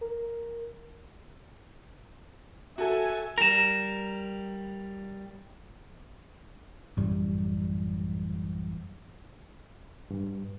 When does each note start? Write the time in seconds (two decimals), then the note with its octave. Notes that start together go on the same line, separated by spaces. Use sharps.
0.01 A#4
2.78 F#4 A4 E5 G#5
3.38 G3 A#4 A#6 E7
6.97 A1 F#2 G3
10.11 G2